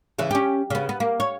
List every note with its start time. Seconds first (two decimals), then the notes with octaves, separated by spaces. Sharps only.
0.19 C#3 E3
0.31 C#4 G4
0.70 C#3 B3
0.89 B3
1.00 A#3
1.20 C#5